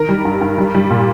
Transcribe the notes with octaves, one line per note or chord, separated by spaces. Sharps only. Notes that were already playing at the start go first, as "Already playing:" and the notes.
Already playing: D#3 A#4
G3
G2
G2
G3
G3
A#2